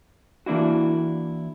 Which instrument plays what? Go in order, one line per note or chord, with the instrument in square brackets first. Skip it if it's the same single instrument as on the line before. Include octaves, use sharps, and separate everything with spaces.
[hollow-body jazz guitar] E3 A#3 D4 E4 F#4